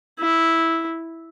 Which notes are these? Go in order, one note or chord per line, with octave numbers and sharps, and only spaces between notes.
E4